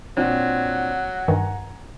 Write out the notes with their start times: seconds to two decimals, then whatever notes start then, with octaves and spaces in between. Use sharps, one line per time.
0.17 A#2 F#3 C4 D4 F#5
1.28 G2 D#3 G#5 A#5